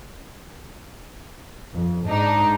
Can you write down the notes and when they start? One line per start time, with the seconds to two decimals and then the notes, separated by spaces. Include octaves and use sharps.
1.74 F2
2.06 G#2 D4 D#4